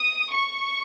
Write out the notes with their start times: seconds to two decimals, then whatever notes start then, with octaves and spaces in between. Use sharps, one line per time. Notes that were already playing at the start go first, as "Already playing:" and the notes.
Already playing: D#6
0.32 C#6